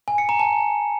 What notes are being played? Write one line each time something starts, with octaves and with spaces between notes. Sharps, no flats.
G#5
C#7
A#5
A5